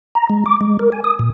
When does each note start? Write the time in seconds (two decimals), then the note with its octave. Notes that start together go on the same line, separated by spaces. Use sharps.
0.15 A#5
0.29 G#3
0.46 D6
0.61 G#3
0.79 A#4
0.92 G#5
1.04 D#6
1.19 A#2